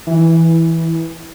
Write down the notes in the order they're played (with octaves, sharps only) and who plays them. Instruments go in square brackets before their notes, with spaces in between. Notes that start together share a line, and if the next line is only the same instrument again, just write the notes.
[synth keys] E3